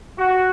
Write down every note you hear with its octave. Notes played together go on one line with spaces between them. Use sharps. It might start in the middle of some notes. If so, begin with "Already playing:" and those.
F#4